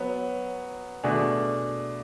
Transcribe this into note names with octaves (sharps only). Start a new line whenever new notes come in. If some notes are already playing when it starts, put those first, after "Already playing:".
Already playing: F#3 B3 C#5
B2 A3 D4 G#4